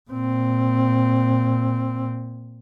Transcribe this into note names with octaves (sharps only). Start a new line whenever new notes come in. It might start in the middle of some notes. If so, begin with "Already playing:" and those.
A#2 C4